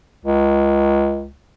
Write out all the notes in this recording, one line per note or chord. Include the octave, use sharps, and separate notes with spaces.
C#2